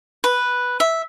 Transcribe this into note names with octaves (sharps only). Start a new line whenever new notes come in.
B4
E5